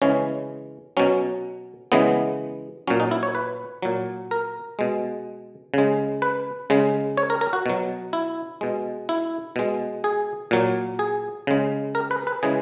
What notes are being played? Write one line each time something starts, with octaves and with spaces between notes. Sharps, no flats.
C#3 E3 G#3 C#4
B2 F#3 C#4
C#3 E3 G#3 B3
A#2 F#3 C#4
D#4
E4
C#5
B4
A#2 F#3
A#4
B2 G#3
C#3 G#3
B4
C#3 G#3
C#5
A#4
A#4
F#4
B2 F#3
E4
B2 G#3
E4
B2 G#3
G#4
A#2 F#3
G#4
C#3 G#3
A#4
B4
B4
C#3 E3 G#3 G#4